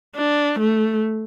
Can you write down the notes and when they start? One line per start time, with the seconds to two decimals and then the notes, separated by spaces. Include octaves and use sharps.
0.16 D4
0.59 A3